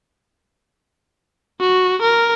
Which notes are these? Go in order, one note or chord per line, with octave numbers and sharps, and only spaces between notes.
F#4
A#4